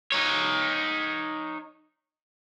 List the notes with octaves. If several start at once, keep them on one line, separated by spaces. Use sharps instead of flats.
D#4 C#5